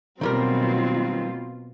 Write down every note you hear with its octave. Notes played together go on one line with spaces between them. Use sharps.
B2 D#3 F#3 G3 A#3 C4 F4 A#4